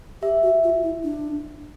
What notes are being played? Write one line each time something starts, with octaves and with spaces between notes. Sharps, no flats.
G4 E5
F#4
F4
E4
D4